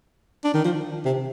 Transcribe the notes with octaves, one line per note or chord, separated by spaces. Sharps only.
D4
D#3
F3
C3